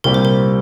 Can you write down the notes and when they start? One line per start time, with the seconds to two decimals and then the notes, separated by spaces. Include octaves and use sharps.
0.04 C2 A#2 G3 C4 G4 A#4
0.14 C5
0.25 A#4